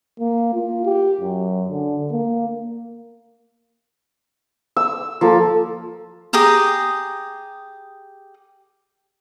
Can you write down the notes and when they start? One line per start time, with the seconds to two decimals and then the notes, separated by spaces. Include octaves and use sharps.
0.20 A#3
0.54 F4
0.85 G4
1.21 F#2
1.69 D3
2.11 A#3
4.77 E6
5.21 F3 A#3 A4
6.33 G4 G#4 A#5 D#6